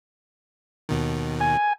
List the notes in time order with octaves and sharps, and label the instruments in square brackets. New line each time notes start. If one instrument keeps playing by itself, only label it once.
[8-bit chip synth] D#2 B2 D#3
[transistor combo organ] G#5